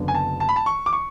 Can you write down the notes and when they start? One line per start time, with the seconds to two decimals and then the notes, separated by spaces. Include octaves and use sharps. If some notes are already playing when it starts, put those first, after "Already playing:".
Already playing: F#1 F#2 D3 F#3 B3
0.08 G#5
0.15 A5
0.40 A5
0.49 B5
0.56 A5
0.66 C#6
0.86 D6
0.93 C#6